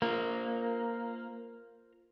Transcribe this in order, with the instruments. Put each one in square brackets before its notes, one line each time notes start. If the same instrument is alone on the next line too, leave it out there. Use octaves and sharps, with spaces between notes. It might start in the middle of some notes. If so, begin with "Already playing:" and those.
[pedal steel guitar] A#3 [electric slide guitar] F4 A#4 C5